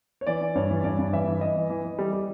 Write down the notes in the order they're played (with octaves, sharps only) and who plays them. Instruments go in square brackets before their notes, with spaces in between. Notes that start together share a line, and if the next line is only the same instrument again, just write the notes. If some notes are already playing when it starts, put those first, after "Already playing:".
[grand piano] C#5
E3 D5
E3
G2 C#5
E3
G2 D5
G2
E3 E5
E3
E3 D#5
E3
E3
E3
G3
G3